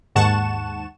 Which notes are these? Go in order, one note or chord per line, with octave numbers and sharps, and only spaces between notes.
D#2 G#2 F#5 A5 C#6 E7